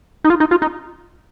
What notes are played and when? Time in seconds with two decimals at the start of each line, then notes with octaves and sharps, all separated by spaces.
0.24 D#4
0.30 F4
0.40 D#4
0.51 F4
0.62 D#4